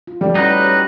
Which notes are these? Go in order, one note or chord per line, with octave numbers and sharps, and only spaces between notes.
F4
G3 G4 A4 D5
A3 C#4 D#4 E4 F#4 B4 F#6
C#5